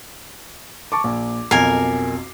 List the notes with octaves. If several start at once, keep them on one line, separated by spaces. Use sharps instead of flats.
A5 C#6 D6
A#1
B1 F2 A#4 G#5 C7